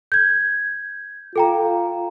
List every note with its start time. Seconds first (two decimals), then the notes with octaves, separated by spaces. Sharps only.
0.12 G6 G#6
1.36 F4 A4 G5 A#5